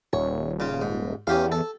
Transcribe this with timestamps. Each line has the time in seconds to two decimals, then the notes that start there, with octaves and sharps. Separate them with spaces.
0.13 D#1 C#5
0.60 C#3 F4
0.82 G#2
1.27 E2 C#4 G4 F5
1.52 A4